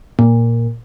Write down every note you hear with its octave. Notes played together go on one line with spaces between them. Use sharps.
A#2